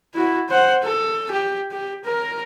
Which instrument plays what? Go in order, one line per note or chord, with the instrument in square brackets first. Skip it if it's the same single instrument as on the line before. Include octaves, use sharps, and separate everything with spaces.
[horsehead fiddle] E4 F#4
C5 F#5
A4
G4
G4
A#4